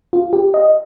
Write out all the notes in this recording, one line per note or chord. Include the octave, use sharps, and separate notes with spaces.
F4
G4
D#5